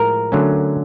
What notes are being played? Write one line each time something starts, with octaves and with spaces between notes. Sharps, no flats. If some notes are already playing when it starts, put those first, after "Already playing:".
Already playing: A2 F3 G#3 A#4
D3 F#3 A3 C#4